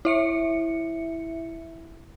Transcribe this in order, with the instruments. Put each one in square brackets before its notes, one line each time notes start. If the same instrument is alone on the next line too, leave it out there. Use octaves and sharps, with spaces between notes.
[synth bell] E4 E5 C#7